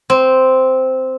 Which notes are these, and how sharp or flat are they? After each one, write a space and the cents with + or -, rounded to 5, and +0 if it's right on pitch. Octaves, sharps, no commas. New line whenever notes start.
C4 -5